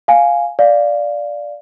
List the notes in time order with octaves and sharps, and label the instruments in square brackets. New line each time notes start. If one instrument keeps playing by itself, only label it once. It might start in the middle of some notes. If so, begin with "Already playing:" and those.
[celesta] F5 G#5
D5 F5